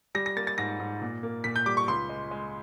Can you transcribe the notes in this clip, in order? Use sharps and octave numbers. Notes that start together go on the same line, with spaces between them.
G3 A#6
A#6
A#3 A6
A6
G#2 A#6
G#2
A#2
A#3
A#2 B6
G6
G3 D6
C#6
C#2 C6
G#3
G#3